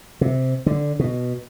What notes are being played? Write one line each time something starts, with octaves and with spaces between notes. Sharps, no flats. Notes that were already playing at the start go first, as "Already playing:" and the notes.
C3
D3
B2